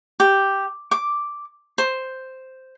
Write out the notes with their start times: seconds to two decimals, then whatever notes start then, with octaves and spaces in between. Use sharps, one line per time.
0.20 G4
0.91 D6
1.78 C5